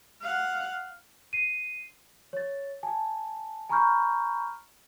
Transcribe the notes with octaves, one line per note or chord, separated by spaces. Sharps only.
F5 F#5
C7 D#7
C#5 A6
G#5 A5
G#5 A#5 B5 C#6 F6 G6